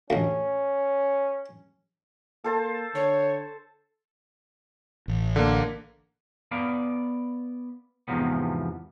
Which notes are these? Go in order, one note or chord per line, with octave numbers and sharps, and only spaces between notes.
A1 D2 C#4
A#3 A4 C5 A5
D3 C#5
A1
D3 A#3
B3 D5 F5
E2 G#2 C3 F3 B3